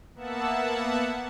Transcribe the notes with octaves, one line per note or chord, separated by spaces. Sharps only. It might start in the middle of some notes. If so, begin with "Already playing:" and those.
A#3 B3 E5 F#5 A5